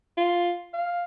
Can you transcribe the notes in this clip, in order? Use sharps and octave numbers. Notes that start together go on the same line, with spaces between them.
F4
F5